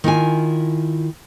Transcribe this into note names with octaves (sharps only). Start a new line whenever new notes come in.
D#3 E4 F4 G#5